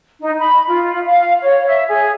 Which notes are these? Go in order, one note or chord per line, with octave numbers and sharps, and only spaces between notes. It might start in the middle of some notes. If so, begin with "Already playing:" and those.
D#4
B5
F4
F5
C#5
E5
G#4